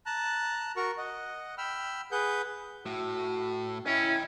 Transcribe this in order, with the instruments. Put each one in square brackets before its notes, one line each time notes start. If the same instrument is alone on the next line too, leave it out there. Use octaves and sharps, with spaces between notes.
[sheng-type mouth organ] A5 A#5 F#6
F#4 A#4 A#5 C#6
D#5 F#5
G5 B5 E6 F6
G#4 B4 F#5 G6
[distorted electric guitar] A2 [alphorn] F#4
[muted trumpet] C#4 [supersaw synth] E4 [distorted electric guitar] D#5 G5